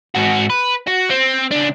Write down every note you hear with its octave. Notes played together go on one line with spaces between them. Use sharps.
G#2 F#4
B4
F#4
C4
C#2 D4